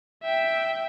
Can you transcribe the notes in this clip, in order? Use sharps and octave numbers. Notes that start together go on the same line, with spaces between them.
E5 G5